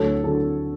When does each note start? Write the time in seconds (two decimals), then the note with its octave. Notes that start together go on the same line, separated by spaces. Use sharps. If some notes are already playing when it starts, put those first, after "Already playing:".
Already playing: D2 D3 F#3 A4 C#5
0.24 D3 F#3 A4